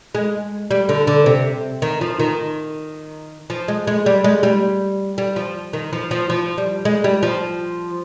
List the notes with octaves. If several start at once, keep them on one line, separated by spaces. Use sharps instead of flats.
G#3
G3
D3
D3
C3
D#3
F3
D#3
F3
G#3
G#3
G3
G#3
G3
G3
F3
D#3
F3
F3
F3
G3
G#3
G3
F3